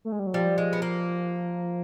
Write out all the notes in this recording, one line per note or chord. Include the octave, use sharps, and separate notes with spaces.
A3
G#3
G3
F#3
F3 G3
G#3
B3
A#3